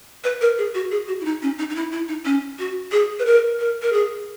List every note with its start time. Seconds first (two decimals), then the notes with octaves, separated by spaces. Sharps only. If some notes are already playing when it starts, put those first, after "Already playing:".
0.24 B4
0.41 A#4
0.58 G#4
0.74 F#4
0.91 G#4
1.08 F#4
1.21 E4
1.25 D#4
1.42 C#4
1.59 D#4
1.70 D#4
1.75 E4
1.92 E4
2.08 D#4
2.25 C#4
2.59 F#4
2.92 G#4
3.19 B4
3.26 A#4
3.60 A#4
3.82 A#4
3.93 G#4